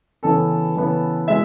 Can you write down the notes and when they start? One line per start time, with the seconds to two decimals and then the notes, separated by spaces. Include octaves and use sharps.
0.23 C#3 E3 B3 A4
0.76 C#3 E3 B3
1.28 B2 G#3 E5